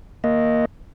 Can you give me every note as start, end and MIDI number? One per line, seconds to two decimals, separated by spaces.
0.24 0.65 58
0.24 0.65 75